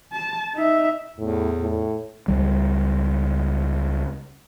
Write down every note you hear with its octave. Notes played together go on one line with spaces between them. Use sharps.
A5
D#4 E5
E2 A2
A2
C#2 G3